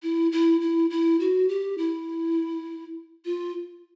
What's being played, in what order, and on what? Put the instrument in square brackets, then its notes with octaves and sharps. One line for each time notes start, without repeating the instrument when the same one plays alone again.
[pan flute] E4
E4
E4
E4
F#4
G4
E4
F4